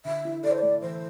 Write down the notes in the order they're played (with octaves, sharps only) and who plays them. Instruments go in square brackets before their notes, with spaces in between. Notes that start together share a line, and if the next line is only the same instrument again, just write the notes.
[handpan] D3 [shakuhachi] E5
[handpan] E4
[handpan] A4 [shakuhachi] D5
[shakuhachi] C5
[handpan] A3 [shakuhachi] D5
[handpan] E3 [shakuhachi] C5